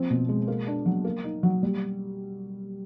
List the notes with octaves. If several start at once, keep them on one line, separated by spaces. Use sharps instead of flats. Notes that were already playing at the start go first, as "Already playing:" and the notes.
Already playing: F3 C4
B2
G#3
A#3
D4
F#3
A#3
D#4
F#3
G3